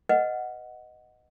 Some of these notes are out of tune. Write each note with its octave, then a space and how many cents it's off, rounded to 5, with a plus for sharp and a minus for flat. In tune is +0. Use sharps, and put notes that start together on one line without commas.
B4 +5 D#5 +0 F#5 +0